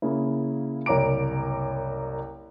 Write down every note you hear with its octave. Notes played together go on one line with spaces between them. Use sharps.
C#3 A#3 E4
F#1 C2 C#5 A#5 D6 D7